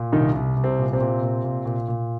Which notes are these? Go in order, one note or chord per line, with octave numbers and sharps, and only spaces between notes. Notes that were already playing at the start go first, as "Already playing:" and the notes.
Already playing: A#2
C2 D#3 D#4
C2
C2
C3 C4
A#2
C3 C4
A#2
A#2
A#2
A#2
A#2